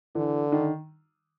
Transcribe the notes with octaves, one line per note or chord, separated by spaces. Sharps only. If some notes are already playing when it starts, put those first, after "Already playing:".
D3 E3
D#3